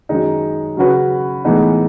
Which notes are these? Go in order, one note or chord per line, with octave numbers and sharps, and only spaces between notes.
F#2 D#3 G#3 D#4
C#3 F#3 C#4 F#4 B4
A2 E3 G#3 B3 D#4